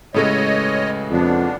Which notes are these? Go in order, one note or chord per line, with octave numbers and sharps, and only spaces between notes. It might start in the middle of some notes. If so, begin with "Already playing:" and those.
A2 C#3 G#3 G4 A4 B4 C#5 D#5
F2 B3 D4